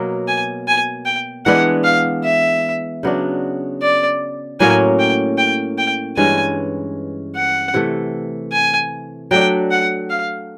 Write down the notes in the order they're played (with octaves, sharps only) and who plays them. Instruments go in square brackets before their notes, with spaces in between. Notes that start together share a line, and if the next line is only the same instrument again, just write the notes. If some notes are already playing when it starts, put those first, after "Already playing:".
Already playing: [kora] B2 F#3 A#3
[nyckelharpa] G#5
G#5
G5
[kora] E3 G#3 B3 D4 [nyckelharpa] F#5
[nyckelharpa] F5
E5
[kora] C#3 F#3 B3 D4
[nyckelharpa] D5
[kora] A2 F#3 A#3 C#4 [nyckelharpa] G#5
[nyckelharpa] G5
G5
G5
[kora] G2 E3 G#3 C#4 [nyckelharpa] G#5
[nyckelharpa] F#5
[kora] C3 E3 A3
[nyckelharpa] G#5
[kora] F#3 A3 D4 [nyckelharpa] G5
[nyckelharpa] F#5
F5